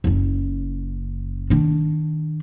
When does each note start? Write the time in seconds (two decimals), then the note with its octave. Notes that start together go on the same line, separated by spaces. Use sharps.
0.04 F#1 C#4
1.50 D#3 D4